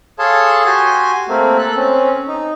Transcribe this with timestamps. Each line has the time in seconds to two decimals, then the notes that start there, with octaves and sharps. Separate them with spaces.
0.19 G#4 A4 C#5 F5 A5 C6
0.66 F#4 G4 G#5 C6
1.29 A3 A#3 C4
1.59 A4 F#6
1.76 C4 C#4
2.27 D#4